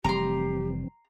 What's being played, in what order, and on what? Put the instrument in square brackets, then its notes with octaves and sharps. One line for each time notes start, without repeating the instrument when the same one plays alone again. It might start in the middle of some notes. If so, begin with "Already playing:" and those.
[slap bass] F1 G3 [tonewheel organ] E3 C4 [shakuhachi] G4 [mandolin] A#5 C6